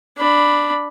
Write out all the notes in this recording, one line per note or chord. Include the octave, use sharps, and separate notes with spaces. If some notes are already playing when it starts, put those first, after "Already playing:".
D4 B5